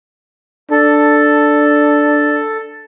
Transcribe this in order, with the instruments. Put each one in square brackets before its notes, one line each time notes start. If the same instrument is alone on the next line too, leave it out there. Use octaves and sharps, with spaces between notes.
[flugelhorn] D4 [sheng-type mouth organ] A4